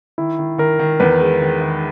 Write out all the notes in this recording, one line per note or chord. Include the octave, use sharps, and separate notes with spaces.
D#3 E4
D#3
D#3 A#4
D#3
E2 B4
G#3
D#3
D#3